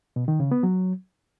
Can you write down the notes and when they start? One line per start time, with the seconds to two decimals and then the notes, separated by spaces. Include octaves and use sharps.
0.16 B2
0.28 D#3
0.40 C#3
0.51 B3
0.63 F#3